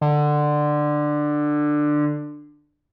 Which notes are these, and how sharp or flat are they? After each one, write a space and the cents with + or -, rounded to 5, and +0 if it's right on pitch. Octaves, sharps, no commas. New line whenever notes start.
D3 +15